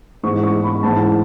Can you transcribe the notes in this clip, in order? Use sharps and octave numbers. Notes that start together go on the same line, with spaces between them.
G#2 E3 C#6
C#6
B5
G#2 E3 A5